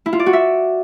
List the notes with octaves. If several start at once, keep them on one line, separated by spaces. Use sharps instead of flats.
E4
F4
D5
F#4
E5